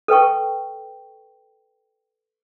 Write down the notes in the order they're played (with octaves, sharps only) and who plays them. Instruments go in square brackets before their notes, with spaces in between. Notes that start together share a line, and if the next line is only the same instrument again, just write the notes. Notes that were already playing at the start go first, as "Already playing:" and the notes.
[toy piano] A4 B4 G5 C#6